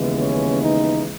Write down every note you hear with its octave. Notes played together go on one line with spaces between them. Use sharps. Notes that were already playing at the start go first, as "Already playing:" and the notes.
Already playing: D#2 C#3 E3 G#3 B3
C#4
D#4